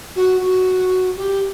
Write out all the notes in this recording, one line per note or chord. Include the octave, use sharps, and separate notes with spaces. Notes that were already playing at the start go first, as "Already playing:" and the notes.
F#4
F#4
G4